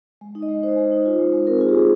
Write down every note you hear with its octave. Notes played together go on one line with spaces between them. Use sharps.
G#3
D#4
D#5
G#3
D#4 C5
G#3
D#4
F4
G#3
G#3
C4 A#4
F4 G#4
G4
G#3 G#4